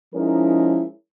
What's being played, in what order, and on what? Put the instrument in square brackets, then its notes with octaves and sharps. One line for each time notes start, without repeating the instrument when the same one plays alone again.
[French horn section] F3 G#3 C#4 D#4 E4 A#4